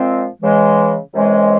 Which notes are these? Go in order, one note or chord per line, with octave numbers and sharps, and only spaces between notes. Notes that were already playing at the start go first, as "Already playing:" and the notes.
Already playing: A#2 F3 G#3 C4
C#3 E3 G#3
C2 C3 E3 G#3 C#4